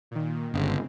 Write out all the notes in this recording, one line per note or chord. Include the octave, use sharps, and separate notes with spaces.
A#2 D#3
G1 C#3 G#3 C4